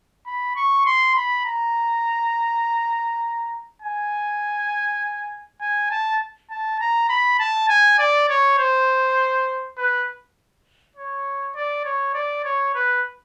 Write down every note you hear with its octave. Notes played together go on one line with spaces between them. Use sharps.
B5
C#6
C6
B5
A#5
G#5
G#5
A5
A5
A#5
B5
A5
G#5
D5
C#5
C5
B4
C#5
D5
C#5
D5
C#5
B4